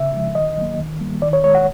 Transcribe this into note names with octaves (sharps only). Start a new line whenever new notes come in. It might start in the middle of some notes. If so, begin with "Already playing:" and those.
Already playing: C#3 E5
F3 G#3
D#3 D#5
F#3 A#3
D#3
G3 A#3
D#3 D5
C#5
G#3 C#5
F#5